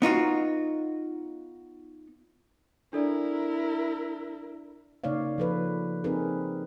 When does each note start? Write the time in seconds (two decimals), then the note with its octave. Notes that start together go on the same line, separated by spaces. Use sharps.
0.02 B3 D#4 F4 F#4
2.93 D4 E4 A4 A#4 D5
5.04 C#3 A#3 D#4 C#5 D5 F5
5.38 F3 A4 B4
6.04 C4 D#4 G#4 A#4 B4